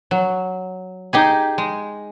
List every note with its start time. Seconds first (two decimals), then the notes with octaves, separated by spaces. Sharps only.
0.11 F#3
1.13 D#4 G4 G#4
1.58 G#3